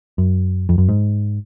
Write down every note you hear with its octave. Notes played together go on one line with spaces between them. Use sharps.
F#2
F2
F#2
G#2